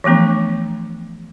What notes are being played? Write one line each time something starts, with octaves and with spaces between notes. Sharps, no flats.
E3 F3 A3 B3 D4